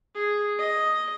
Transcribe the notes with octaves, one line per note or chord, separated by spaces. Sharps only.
G#4
D#5